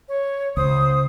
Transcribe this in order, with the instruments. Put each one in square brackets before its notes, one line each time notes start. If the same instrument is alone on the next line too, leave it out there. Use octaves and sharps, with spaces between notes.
[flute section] C#5
[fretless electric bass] C#2 [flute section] C5 D#6